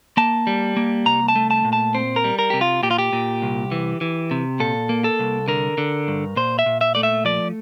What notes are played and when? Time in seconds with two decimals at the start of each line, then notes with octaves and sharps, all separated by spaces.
0.17 A#3 A5
0.47 G3
0.77 A#3
1.06 C2 A#5
1.28 A5
1.36 A3
1.51 A5
1.65 A#2
1.73 A5
1.95 C4 C5
2.16 A#4
2.24 G3
2.39 A#4
2.50 C3 G4
2.61 F4
2.83 A#2 G4
2.91 F4
2.98 G4
3.13 A#2
3.42 C2
3.72 E3
4.01 E3
4.31 C3
4.60 A#2 A4
4.89 A#3
5.04 A4
5.19 C2
5.48 D3 A#4
5.78 D3
6.08 G2
6.36 A#2 C5
6.59 E5
6.66 A#2
6.81 E5
6.95 A3 D5
7.03 E5
7.25 F3 D5